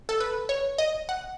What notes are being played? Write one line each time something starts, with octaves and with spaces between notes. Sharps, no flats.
A4
B4
C#5
D#5
F#5